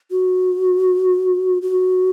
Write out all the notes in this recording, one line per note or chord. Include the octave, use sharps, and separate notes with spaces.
F#4
F#4